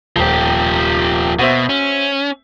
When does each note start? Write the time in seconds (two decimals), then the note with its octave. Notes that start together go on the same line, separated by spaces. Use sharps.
0.16 D#1 F3 G4 C5
1.39 B2 F#4 C5 E5
1.69 C#4